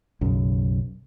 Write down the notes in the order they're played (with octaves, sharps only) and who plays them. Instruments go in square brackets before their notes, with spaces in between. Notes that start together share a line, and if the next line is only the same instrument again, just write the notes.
[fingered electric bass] B1 F#2 C#3